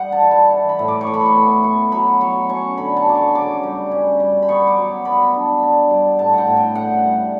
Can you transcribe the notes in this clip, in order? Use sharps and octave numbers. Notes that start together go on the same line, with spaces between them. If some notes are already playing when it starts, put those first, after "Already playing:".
Already playing: G3 F#5
A5
E3
A5
E3
B5
A2
D6
C#6
A2
B5
C#6
B3
B3 C#6
F#3 B5
F#3 C#6
C#4 C#6
D3 B5
A5
F#3 D6
C#6
C#3 D6
G3
C#4
G3
B5
B3 C#6
D6
F#3
B3 B5
D4
D4
G3
A2 A5
F#5 G5
A2
G5
C#3 F#5
G3